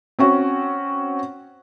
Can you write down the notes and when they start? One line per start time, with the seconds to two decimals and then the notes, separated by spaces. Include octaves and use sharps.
0.19 C4 C#4 F#4